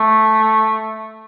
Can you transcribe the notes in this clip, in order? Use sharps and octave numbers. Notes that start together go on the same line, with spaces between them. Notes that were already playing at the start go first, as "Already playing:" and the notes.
Already playing: A3